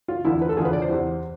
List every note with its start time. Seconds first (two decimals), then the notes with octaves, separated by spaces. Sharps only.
0.08 F4
0.25 E2 D3 F3 E4
0.41 B4
0.49 A4
0.57 E2 D3 F3 G#4
0.65 B4
0.73 D5
0.82 C5
0.89 E2 C3 E3